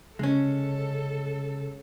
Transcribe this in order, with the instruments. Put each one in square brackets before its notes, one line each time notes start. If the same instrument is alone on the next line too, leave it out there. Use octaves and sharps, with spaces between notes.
[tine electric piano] C#3 [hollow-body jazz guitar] G#3 C#4 [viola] A4